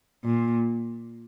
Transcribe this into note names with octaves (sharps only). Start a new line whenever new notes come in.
A#2